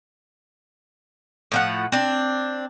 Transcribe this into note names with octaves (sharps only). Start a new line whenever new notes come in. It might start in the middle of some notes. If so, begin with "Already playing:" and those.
A2 F3 F#5
C4 D4